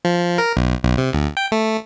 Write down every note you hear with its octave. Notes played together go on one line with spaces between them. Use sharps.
F3
A#4
B1
B1
C3
D2
G5
A3